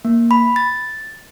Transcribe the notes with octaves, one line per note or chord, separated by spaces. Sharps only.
A#3
B5
A6